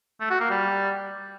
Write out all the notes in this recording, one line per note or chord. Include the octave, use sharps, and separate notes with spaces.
A3
F#4
A#3
G3